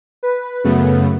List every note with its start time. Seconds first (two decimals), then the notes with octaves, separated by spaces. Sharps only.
0.23 B4
0.64 F#2 C#3 A3 B3